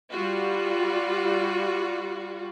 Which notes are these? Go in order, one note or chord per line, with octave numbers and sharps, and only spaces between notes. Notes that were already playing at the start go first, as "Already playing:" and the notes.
G3 F4 F#4